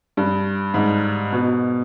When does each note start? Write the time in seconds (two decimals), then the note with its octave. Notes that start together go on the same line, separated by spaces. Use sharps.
0.17 G2
0.74 G#2
1.32 B2